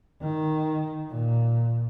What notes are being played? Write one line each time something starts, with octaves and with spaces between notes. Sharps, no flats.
D#3
A#2